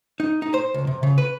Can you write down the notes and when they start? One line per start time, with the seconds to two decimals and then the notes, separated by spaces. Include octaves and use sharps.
0.20 D#4
0.42 D#4
0.54 C5
0.74 C#2
0.87 C3
1.03 C#3
1.18 B4